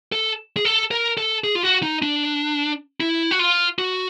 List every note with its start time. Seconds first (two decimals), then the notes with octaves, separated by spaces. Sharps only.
0.12 A4
0.57 G#4
0.65 A4
0.91 A#4
1.18 A4
1.44 G#4
1.55 F4
1.63 F#4
1.83 D#4
2.02 D4
3.00 E4
3.31 F#4
3.39 F4
3.79 F#4